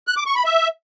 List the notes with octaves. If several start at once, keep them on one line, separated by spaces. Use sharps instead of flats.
F#6
D6
C#6
B5
E5